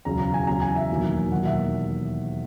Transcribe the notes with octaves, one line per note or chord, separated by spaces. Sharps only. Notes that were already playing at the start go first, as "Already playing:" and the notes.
E1 E2 C#3 F#3 A#5
A#5
G#5
E2 C#3 F#3 A#5
G#5
E5
E1 D#2 D#3 F#3
E1 D#2 D#3 F#3 F#5
E5